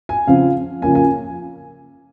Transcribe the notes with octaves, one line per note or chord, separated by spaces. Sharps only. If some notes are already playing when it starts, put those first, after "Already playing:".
G#5
C#3 F3 C4 F5
C#3 F3 A#3 C#4 G#5
G#5